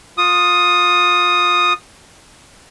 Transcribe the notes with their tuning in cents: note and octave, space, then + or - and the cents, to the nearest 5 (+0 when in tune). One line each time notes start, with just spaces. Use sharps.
F4 +25 D#6 +0